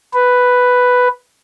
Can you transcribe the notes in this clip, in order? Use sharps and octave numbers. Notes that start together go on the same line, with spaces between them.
B4